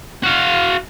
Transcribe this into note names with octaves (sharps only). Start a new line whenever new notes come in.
F#4 F5